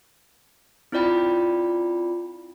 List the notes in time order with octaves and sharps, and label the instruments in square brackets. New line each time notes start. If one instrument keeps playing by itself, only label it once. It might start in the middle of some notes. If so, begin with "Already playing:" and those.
[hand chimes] C4 E4 F4 D5 G5 B5